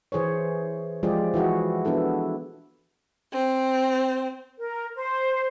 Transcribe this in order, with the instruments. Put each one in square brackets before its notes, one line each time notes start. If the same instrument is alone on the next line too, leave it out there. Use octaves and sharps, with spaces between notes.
[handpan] E3 G#4 C5 C#5
F3 G#3 F4 G4 G#4 D5
E3 E4 F#4 G#4
B3 D4 E4 A4
[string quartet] C4
[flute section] A#4
C5